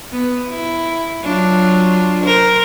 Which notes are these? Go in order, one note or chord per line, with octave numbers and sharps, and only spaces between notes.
B3
E4
F#3 D4 F4
A#4 C5